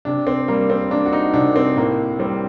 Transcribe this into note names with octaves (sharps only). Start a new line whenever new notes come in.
C3 D4
C4
G3 A#3
C4
A#3 D4
F#4
D#4
C3 D4
C4
A2 A#3
G3 C4